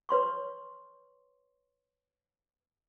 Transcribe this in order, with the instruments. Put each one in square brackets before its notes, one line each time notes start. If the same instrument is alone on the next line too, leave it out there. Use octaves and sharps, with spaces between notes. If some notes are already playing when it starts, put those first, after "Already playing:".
[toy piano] B4 C#5 C6 C#6